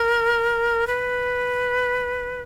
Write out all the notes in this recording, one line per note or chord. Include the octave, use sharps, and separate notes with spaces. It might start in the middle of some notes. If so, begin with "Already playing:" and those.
Already playing: A#4
B4